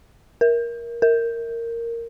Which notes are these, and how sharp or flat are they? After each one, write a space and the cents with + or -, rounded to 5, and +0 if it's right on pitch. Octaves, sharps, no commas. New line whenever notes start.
A#4 +15
A#4 -10